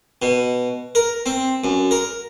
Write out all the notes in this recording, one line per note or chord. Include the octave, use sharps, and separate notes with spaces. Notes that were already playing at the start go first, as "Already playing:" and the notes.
B2
A#4
C4
F#2
A#4